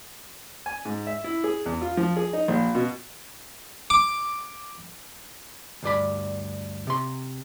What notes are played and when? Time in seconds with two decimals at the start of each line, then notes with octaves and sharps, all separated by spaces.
0.66 G#5
0.85 G#2
1.07 E5
1.24 E4
1.44 G#4
1.66 E2
1.81 F4
1.97 F3
2.16 G#4
2.33 D#4
2.48 A#1
2.75 B2
3.90 D6
5.83 D2 G2 D5 B5
6.87 C3 C6